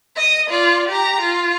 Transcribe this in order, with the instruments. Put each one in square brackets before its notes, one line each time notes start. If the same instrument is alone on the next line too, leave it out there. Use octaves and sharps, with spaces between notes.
[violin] D#5 D#6
F4 D5
G4 A#5
F4